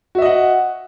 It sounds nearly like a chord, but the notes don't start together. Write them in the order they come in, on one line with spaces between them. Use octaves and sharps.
F#4 E5 D#5 F#5